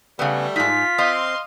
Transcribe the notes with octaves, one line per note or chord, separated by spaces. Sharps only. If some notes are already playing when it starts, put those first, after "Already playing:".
C#3 G3 A3 B3
G#2 D#4 F4 B6
C4 D#5 F5 C6